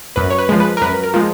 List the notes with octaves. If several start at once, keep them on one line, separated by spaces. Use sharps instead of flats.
F#2 B4
C#5
B4
F3 G#3
B4
A#4
F#2 B4
A#4
F3 G#3